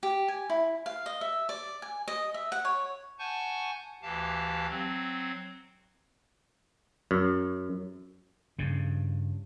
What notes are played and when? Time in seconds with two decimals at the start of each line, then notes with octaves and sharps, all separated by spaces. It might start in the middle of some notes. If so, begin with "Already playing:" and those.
0.03 G4
0.28 G#5
0.50 E4
0.86 F5
1.06 D#5
1.21 E5
1.49 D5
1.82 G#5
2.08 D#5
2.34 E5
2.52 F#5
2.65 C#5
3.19 F#5 G#5 A5 C#6 G6
4.02 D2 E3 G4 F5 A5
4.69 F#3 C4
7.11 F#2
8.59 G2 C#3